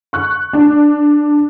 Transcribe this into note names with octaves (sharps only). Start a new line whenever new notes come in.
C#6 F#6
D4